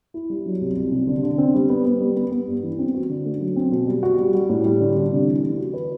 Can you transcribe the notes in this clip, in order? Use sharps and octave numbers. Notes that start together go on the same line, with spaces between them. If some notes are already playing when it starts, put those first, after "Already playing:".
E4
G3
F#3
C2
C2
C3
D3
D3
C4
G3
B3
B3
G3
B3
B3
G2
E3
C4
F#4
D3
A3
F#3
C4
B2
G3
F#4
G3
G3
A2
G3
D3
D3
C3
E3
E3
F#4
B4